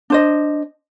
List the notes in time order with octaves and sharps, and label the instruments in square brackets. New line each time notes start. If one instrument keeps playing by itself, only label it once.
[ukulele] D4 C5 D#5